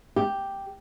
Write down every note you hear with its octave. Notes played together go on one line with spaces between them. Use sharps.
G4